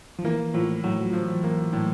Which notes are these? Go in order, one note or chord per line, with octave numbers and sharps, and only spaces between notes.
F3
E3 A#3
A2 F3
A2 F#3
F3
A#3
A2